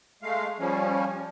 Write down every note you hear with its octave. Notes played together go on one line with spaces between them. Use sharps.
G#3 A3 F5
F3 G3 C#4